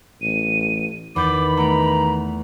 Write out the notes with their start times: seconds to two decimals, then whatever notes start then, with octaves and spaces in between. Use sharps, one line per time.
0.22 A1 D#7
1.16 E2 D#3 B5 D6 G6 A6
1.57 A3 B3 A#5 D7